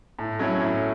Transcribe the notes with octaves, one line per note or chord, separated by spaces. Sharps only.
A2
F#3 C#4 E4
A2